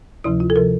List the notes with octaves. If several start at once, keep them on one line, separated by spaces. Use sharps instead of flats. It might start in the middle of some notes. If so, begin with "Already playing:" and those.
D2 C3 F3 E4
F4
A4
C3 F3 A#4